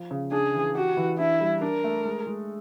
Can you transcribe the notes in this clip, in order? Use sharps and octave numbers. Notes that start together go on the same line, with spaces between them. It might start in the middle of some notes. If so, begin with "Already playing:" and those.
Already playing: F3
C#3
D4 G#4
E3
F#4 G4
E3
D4 E4
G3
D4 A#4
A3
G#3
G#3